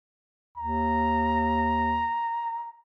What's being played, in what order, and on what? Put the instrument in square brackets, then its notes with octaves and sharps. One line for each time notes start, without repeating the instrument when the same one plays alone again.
[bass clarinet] D#2 [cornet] A#5